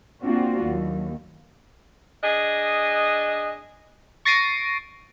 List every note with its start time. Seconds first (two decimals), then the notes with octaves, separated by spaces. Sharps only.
0.22 A#3 C4 D4 F4 F#4
0.63 D#2 F#3
2.23 D4 G#4 D#5
4.25 C#6 A6 A#6 C7 D7 D#7